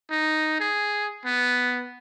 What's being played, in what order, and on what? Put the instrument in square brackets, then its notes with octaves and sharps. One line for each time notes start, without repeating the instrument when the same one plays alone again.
[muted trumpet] D#4
G#4
B3